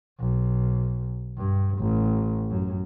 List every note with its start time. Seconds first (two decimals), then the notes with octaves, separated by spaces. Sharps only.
0.19 B1
1.37 G2
1.78 A1
2.50 F#2